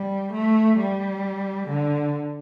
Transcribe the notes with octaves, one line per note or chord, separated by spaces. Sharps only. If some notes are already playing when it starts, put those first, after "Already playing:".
Already playing: G3
A3
G3
D3